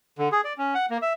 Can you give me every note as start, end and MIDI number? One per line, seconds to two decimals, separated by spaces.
0.18 0.29 50
0.32 0.41 68
0.44 0.53 74
0.58 0.74 61
0.75 0.86 78
0.90 0.98 58
1.02 1.13 76